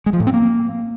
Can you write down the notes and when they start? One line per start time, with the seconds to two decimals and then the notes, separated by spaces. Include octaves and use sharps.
0.06 G#3
0.13 F3
0.20 A2
0.27 C4
0.34 A#3